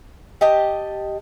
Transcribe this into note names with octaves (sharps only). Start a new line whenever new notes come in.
G4 D#5 A5